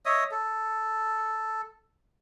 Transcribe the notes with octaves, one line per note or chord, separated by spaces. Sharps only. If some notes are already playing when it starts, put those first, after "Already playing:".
C#5 D#5 E5 D#6
A4